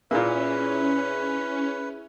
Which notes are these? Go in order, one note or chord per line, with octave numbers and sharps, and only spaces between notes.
A#2 A#3 C#4 E4 G#4 B4 E5